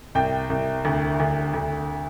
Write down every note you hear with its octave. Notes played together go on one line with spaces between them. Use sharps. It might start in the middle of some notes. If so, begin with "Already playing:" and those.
C2 G5
C2
D2
D2
D2